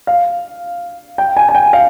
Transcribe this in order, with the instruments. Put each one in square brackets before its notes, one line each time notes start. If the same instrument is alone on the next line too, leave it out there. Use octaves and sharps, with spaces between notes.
[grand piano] F5
G5
G#5
G#5
G5
F5